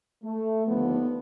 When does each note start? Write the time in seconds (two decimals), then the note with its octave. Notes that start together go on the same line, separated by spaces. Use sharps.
0.23 A3
0.67 D#2 D3 F3 B3